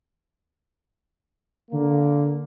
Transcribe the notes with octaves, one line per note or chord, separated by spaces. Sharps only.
D3 A#3